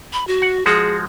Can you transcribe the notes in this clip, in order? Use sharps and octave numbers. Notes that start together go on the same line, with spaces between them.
B5
F#4
F#5
F3 G#3 F#4 G#4